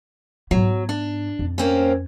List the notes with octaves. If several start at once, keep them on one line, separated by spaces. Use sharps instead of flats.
G#2 F#3 B3
D4
F2
A#3 C4 C#4